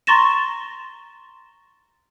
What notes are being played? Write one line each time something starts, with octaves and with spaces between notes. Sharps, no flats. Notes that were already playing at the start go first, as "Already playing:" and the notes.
A#5 C6 C#6 A6 A#6 E7